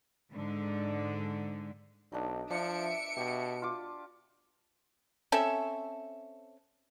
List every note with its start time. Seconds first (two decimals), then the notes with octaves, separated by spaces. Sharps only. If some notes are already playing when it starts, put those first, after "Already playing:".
0.32 G#2 D3
2.12 B1 D4 D#4
2.50 F3 D4 E5 C#7 D7
3.17 B2 G4
3.62 F4 D6
5.32 C4 C#4 A4 E5